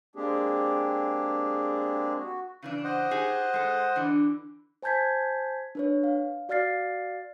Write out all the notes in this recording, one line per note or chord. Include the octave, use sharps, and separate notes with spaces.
G#3 A#3 C4 D4 G4 G#4
F#4
C#3 E3 D4
C5 D#5 F#5
D#4 G4 G#4
G#3 A4
D3 E3 D4
C5 G#5 A5 G6 G#6 B6
D4 B4 C#5
F5
F#4 D5 F5 F6 A6 C7